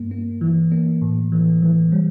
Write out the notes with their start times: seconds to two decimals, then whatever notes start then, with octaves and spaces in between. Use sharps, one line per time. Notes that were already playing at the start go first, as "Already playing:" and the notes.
Already playing: G2 A#3
0.11 A#3
0.41 E3
0.72 A#3
1.01 A2
1.32 E3
1.62 E3
1.92 G3